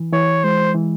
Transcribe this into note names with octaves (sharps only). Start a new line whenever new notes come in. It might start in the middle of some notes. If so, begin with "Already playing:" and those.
Already playing: E3
E3 C#5
G#3 C5
E3